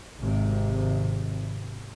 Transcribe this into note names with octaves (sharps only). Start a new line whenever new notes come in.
G#1 C3